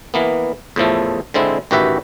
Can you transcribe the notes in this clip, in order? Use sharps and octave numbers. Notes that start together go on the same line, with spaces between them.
E3 A#3 B3
E2 A2 F3 A3
D3 G#3 C4 E4
A1 D#3 F#4 G4 B4 E5